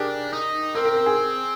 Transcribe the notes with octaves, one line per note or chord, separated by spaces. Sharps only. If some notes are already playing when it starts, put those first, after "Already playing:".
Already playing: D4 G4 G#4 A#4
D#4
C4 A#4
A#4
A#4
G#4